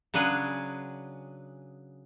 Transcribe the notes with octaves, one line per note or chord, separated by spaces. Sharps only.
C#3 F#3 D4 G#4 B4